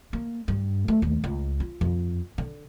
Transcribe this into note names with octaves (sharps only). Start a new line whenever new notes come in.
A#3
G2
A3
D#2
C#2
F4
F2
D3